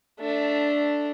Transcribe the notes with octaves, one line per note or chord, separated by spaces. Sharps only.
A3 D4